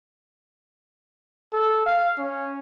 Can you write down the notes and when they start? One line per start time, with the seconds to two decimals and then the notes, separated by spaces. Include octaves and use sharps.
1.53 A4
1.86 F5
2.18 C#4